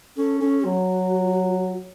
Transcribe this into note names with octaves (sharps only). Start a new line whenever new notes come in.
C#4 A4
C#4 A4
F#3 F#4